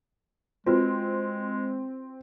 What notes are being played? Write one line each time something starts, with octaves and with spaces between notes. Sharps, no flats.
G#3 C4 F4 F#4 B4